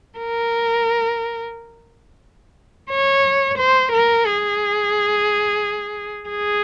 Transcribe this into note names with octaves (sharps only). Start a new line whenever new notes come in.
A#4
C#5
C5
A#4
G#4
G#4